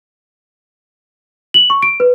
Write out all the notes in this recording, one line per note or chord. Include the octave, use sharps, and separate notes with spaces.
F#7
C#6
D7
B4